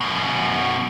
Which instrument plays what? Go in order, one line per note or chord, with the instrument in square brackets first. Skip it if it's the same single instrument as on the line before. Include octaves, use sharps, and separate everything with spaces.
[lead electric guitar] F#2 B2